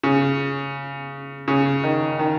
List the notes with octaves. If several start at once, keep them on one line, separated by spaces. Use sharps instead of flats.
C#3
C#3
D#3
D#3